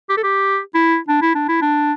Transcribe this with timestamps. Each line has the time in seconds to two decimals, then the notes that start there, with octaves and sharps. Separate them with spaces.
0.09 G4
0.17 A4
0.23 G4
0.74 E4
1.08 D4
1.22 E4
1.35 D4
1.49 E4
1.62 D4